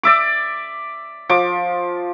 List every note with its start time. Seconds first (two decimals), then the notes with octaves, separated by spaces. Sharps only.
0.03 D5 E5 D6
1.29 F3 D6